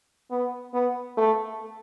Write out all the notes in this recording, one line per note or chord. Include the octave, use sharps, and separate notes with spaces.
B3
B3
A3